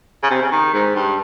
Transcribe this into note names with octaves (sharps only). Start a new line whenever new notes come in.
C#3
C3
C#3
D#3
G#2
G2